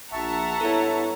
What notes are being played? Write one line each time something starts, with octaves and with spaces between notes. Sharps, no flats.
A#1 E5 F#5 A5 A#5 C#6
G2 B3 E4 A4 C#5